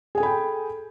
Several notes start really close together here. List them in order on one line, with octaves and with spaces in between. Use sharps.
G#4 G#5 A4 B5 G5